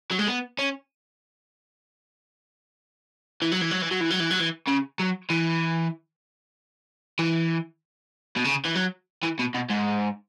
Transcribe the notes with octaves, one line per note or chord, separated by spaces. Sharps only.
F#3
G#3
B3
C#4
E3
F#3
E3
F#3
E3
F#3
E3
F#3
E3
F#3
E3
C#3
F#3
E3
E3
B2
C#3
E3
F#3
E3
B2
B2
G#2